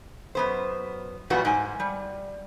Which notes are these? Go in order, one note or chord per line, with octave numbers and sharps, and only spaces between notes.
F#2 B3 C5
F#2 A#2 E3 G3 B3 F#4
G#2 G#5
G3